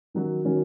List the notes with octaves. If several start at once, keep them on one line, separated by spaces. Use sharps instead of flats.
D#3 F#3 C#4 F#4
D#3 F#3 C#4 F#4